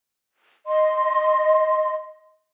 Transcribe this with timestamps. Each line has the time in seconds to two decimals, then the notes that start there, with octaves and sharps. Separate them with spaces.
0.67 D#5 C6